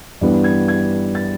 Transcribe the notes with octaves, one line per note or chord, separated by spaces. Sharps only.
G2 E3 G3 B3
G#6
G#6
A6